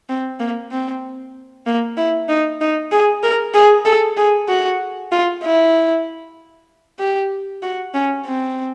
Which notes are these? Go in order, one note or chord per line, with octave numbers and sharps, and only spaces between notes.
C4
A#3
C4
A#3
E4
D#4
D#4
G#4
A#4
G#4
A4
G#4
F#4
F4
E4
G4
F#4
C#4
C4